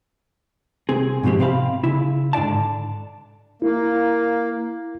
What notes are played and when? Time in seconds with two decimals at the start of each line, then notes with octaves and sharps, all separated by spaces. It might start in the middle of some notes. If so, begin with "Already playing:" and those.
0.89 C2 C4 G#4
1.23 G#2 B2 F3 C4 G4
1.39 C3 C4 C5 C#5 F5 B5
1.84 C#3 E4
2.33 G#2 D3 D5 A5
3.62 A#3 E4